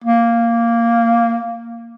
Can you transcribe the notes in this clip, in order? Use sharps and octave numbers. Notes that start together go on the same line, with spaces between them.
A#3